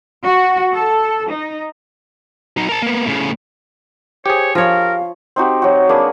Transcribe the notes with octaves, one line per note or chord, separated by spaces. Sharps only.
F#4
A4
D#4
F#3 D#4
A#4 A5
A#3 B3
A2 C#3
G4 G#4 C5 C#5
F3 A#4 C#5 F5
C4 D#4 F#4 G4
F#3 F#4
A#3 D4 G#4 B4